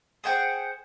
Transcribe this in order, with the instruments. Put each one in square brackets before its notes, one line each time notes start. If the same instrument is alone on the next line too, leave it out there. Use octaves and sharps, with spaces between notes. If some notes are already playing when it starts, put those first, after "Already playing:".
[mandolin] G#4 C5 F#5 G5